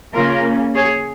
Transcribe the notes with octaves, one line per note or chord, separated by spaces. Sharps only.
C#3 A#3 C#4 F4 A#4
G#4 C#5